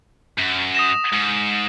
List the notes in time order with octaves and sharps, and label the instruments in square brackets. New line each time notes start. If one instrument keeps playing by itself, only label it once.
[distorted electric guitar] F#2
[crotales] D#6 A#6 E7
[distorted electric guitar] G#2